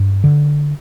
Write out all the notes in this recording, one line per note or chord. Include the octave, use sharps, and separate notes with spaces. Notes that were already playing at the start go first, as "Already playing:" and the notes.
Already playing: G2
D3